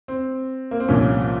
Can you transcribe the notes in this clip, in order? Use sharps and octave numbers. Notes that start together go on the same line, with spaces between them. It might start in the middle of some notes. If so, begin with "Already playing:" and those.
C4
A#3
C4
C2 A#2 F3 C#4